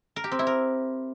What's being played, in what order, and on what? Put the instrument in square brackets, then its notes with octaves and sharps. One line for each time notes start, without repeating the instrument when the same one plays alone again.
[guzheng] A#4
G4
C4
E4
A#4